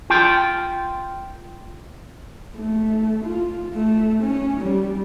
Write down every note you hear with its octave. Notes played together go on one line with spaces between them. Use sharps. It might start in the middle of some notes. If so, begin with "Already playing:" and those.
F4 G5
A3
F4
A3
C#4
G3